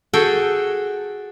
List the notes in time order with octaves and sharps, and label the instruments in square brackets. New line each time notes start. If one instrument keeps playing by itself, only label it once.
[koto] F#4 G#4 A4 G5